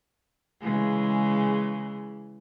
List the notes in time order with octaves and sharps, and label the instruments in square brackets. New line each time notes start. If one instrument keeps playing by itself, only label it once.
[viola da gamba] C#3 E3 G#3